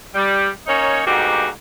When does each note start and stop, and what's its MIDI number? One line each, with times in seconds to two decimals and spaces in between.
0.15 0.49 55
0.67 1.05 58
0.67 1.05 61
0.67 1.05 63
0.67 1.05 73
1.05 1.46 38
1.05 1.46 44
1.05 1.46 47
1.05 1.46 58
1.05 1.46 66
1.05 1.46 67